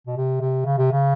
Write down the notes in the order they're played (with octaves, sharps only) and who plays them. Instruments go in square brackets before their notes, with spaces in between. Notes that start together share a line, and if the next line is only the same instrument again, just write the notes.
[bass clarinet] B2
C3
C3
C#3
C3
C#3